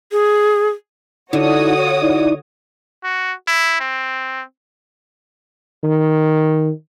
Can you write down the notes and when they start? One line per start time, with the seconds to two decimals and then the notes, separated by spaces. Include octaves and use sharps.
0.12 G#4
1.33 D3 D#4 E4 F#4 C#5 D#6
2.02 D#4 E4 D5
3.04 F#4
3.47 E4
3.80 C4
5.83 D#3